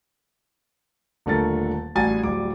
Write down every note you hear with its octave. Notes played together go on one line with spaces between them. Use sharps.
D#1 D3 A3 A#4 A6
A1 G3 F#4 G#5 A6
D1 G3 D6